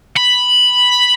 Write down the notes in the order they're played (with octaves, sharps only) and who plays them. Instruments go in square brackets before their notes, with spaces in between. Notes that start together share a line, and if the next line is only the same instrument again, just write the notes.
[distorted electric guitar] B5